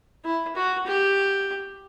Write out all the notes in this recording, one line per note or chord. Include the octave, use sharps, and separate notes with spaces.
E4
F#4
G4